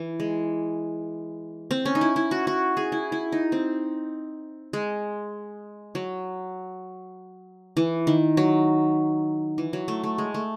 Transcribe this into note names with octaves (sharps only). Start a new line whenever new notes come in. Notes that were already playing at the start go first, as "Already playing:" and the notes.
Already playing: E3
G#3
C4
C#4
D#4
E4
E4
F#4
F#4
G#4
E4
E4
D#4
C4
G#3
F#3
E3
D#3
F#3
E3
F#3
A3
A3
G#3
A3